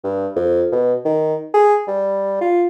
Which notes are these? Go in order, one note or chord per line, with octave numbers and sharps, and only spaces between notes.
G2
F2
B2
D#3
G#4
G3
F4